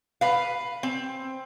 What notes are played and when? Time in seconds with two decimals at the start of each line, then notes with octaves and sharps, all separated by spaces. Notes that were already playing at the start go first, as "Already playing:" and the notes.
0.21 B4 F5
0.83 C4